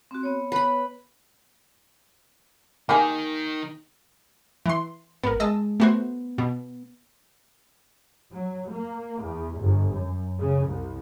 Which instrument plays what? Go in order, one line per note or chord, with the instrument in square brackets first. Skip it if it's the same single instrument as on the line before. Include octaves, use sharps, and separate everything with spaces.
[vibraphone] C4 F#4
B3 C#5
[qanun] B4 B5
[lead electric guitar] D#3 D#4 [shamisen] A#3 G4 G#4
[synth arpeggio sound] E3 C6
[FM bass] G#1 [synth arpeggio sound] B3 A#4
[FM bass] G#3 [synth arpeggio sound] D#5 A5 E6
[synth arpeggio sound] A3 F#4 C5 [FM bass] B3
[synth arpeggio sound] B2
[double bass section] F#3
A#3
E2
G1
F#2
C#3
C2